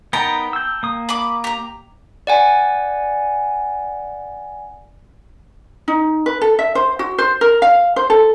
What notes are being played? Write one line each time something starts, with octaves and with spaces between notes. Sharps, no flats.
B3 D#4 A#4 G5 A5 A#5
E6 G6
A#3 D#6
B5 D6
G4 A#5
D5 F#5 G#5
D#4
B4
A4
E5
C5
F#4
C5
A#4
F5
C5
A4